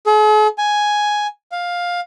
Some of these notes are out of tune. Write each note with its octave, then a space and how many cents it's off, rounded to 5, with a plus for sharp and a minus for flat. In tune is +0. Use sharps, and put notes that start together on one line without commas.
G#4 +45
G#5 +5
F5 +10